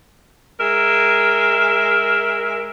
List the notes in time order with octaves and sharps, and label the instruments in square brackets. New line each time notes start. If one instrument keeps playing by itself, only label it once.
[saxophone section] G#3 A#4 E5